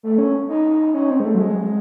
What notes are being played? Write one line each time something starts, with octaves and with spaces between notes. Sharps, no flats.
A3
C#4
D#4
C#4
C4
G#3
A3
F#3
G#3